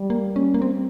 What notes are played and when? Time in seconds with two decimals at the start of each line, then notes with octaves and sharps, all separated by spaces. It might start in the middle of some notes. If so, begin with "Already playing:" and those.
Already playing: G3
0.10 A#3
0.36 C#4
0.54 A#3
0.62 C4